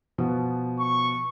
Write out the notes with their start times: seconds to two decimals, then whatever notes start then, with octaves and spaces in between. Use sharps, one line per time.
0.18 B2 F3 B3
0.79 C#6